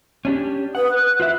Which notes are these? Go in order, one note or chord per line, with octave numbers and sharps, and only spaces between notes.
C#4 D4 G4
B4 F#5 D#6
F#6
F4 B4 E5